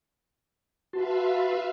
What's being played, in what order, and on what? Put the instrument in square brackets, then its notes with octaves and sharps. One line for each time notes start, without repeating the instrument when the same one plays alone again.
[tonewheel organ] F#4 A5 C6 [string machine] B4 E5 F5